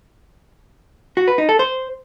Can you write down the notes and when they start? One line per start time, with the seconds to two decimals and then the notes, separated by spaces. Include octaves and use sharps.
1.17 F#4
1.28 B4
1.38 D#4
1.49 A4
1.59 C5